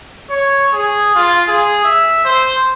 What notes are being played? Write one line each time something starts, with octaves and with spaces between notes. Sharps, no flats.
C#5
G#4
F4
G#4
E5
C5